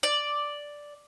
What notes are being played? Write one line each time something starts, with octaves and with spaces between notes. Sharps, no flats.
D5